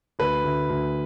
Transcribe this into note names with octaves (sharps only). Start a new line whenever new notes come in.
D2 B4
D2
D2